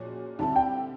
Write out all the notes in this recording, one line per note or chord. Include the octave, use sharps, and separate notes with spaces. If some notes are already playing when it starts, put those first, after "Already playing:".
Already playing: A#2 F3 G#3 C#4 F#4
D3 G3 C4 E4 A5
G5